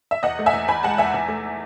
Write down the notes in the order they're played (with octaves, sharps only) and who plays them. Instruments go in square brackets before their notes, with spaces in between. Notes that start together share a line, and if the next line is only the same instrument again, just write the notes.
[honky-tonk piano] E5
E2 D#5 F#5
A3
E5 G#5
E2
E2 G#5 B5
G#3 F#5 A5
E2 E5 G#5
E2
A3